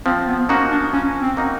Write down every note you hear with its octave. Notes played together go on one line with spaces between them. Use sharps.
F3 C4
B3
A#3 C#4 D#4 F#4
D4
F3 C#4
C4
A#3 D#4 F#4